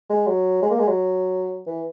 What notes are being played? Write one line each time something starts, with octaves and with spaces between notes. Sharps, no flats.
G#3
F#3
G#3
A#3
G#3
F#3
E3